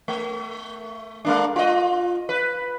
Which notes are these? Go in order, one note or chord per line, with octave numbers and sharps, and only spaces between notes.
A3
G#3 A#3 D4
F4 D#5
B4